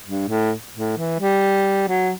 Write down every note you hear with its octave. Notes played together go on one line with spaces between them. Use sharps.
G2
A2
A2
E3
G3
F#3